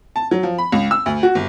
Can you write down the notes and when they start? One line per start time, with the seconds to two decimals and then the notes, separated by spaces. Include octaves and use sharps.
0.16 A5
0.31 F#3
0.43 F3
0.58 B5
0.72 C#2
0.91 E6
1.06 D2
1.23 F#4
1.35 G1